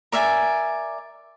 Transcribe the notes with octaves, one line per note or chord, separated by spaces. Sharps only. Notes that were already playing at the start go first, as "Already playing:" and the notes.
A#4 D5 E5 G#5